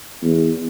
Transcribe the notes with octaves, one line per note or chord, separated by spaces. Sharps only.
E2